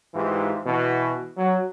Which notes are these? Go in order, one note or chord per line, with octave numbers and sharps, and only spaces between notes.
G#2 E3 F4 G4
B2 E3
F#3